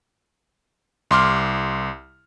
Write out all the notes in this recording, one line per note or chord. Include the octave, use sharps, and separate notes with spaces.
C2 C6 D6 F6